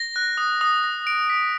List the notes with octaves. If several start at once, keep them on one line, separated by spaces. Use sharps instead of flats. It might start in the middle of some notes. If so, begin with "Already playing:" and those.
Already playing: A#6
F#6
D#6
D#6
A#6
D7
B6